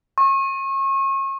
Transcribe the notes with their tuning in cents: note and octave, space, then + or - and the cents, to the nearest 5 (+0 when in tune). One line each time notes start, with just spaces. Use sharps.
C#6 -35